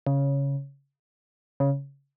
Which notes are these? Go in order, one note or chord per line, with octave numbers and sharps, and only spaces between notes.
C#3
C#3